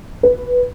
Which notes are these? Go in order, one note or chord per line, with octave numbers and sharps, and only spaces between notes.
B4